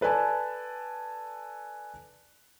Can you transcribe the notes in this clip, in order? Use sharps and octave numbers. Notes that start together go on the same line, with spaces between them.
A4 B4 D5 G#5 A5